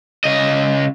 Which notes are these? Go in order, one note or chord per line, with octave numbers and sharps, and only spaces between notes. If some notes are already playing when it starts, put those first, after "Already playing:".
C#3 D#5